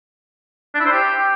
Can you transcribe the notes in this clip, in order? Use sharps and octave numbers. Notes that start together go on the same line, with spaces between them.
D4
E4
C5
G4